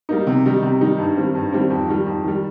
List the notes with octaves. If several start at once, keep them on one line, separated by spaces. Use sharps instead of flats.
G3 A#3 D#4
C3
D#3 G3 D#4
C3
D#3 G3 D#4
G2
D#3 G3 C4
G2
D#3 G3 C4
F2
D#3 G3
F2
D#3 G3